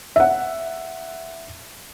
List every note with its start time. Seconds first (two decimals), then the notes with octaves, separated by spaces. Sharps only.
0.16 E5 F#5